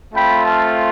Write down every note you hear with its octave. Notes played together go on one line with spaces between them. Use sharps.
A3 C4 F4 G5 B5
F5 A5